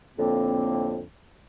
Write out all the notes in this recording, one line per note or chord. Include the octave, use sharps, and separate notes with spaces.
F2 A2 D3 A#3 C4